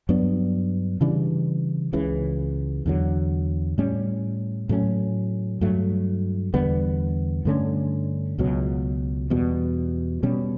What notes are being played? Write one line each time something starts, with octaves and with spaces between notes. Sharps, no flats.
G2 F#3 B3 D4
C#3 E3 G3 D4
C#2 C#3 E3
E2 D3 F#3
A2 G3 C#4
A2 F#3 A3 C#4
G2 F#3 A3
E2 D3 G3 B3
G2 D3 A3 C#4
C#2 B2 F#3
E2 B2 G3
B2 G3 C#4